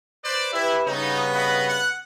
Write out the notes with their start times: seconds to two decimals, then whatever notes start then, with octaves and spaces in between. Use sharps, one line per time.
0.24 B4 C5 D5
0.53 E4 G4 B4 E5
0.87 G2 C#3 B3 D#4
1.34 B4 D#5 F#5
1.69 F#5